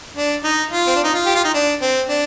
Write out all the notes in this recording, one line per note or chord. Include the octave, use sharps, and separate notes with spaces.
D4
D#4
F4
C4
D4
D#4
F4
G4
F4
D#4
D4
C4
D4